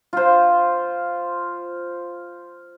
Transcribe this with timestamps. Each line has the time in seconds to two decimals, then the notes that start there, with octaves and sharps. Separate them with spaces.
0.13 F4 C5